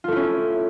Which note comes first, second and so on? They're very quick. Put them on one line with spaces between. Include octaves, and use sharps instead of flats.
F4 A3 E4 C#4